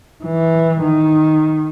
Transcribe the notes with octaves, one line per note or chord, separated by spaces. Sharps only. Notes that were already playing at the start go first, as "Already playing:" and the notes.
E3
D#3